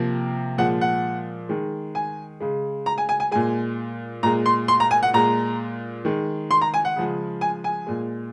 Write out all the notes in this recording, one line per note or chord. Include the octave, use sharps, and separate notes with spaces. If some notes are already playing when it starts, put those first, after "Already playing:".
Already playing: C3 F3 A#3
A#2 F3 G#3 F#5
F#5
D#3 G#3
G#5
C#3 G#3
A#5
G#5
G#5
G#5
A#2 G#3 G#5
A#2 G#3 A#5
C6
C6
A#5
G#5
F#5
A#2 G#3 A#5
D#3 G#3
C6
A#5
G#5
F#5
C#3 F3 G#3
G#5
G#5
A#2 G#3